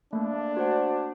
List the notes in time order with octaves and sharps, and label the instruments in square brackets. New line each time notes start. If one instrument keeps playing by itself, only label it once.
[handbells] A3 A#3 [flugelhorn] D4
[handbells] F#4 C5 F#5